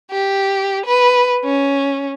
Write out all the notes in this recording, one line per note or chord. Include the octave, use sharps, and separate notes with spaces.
G4
B4
C#4